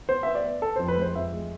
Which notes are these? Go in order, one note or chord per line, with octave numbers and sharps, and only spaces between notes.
B3 C5
B3 E5
D5
B3
B3 A4
F2 C5
B4
G#3 C5
F2 E5
G#3